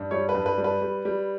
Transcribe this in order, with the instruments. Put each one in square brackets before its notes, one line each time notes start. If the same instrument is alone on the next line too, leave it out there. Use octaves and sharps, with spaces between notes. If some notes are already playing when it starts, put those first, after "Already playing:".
Already playing: [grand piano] G2
G3 C#5
B4
G2
B4
G3
B4
G3
G3